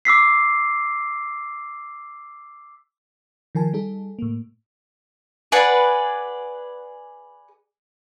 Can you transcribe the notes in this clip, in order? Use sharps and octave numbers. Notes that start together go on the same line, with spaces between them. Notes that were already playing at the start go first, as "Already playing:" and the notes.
D6 E6 B6 C7
D#3 F3 A#4 G#5 A5
G3 D#4 G#4 A4
A2 A#3
G#4 B4 D5 F#5